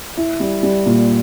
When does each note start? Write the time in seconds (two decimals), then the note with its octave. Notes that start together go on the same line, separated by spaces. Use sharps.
0.17 E4
0.40 G3
0.63 G3
0.86 A#2